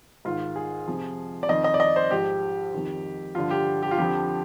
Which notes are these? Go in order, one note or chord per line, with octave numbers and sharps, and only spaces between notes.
G#2 D#3 F4
G#4
F2 C3 F3
D5
F2 D#3 D#5
D#5
D5
D#5
C5
G#2 F3 G4
F2 D#3
G2 D3 F3 F4
G4
G4
F4
F2 D3 F3 G4